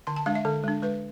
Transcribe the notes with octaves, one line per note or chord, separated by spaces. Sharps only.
D3 C6
A5
G#3 D4 F5
E5
D3 A4
G#3 D4
G#3 B4